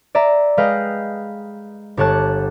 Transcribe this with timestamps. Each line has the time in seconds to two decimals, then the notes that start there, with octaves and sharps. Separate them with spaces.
0.15 D5 E5 A#5
0.57 G#3 B4 D#5 F5 G5
1.97 G1 G4 C#5 F#5 A5 F#6